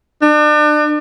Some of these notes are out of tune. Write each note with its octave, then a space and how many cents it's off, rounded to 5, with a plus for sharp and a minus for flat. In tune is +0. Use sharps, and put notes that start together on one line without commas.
D4 +35